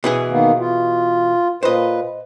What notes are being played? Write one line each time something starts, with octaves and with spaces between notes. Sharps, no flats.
B2 E3 G#4
D#3 A#3 B3
F4
A#2 B4 C5 D#5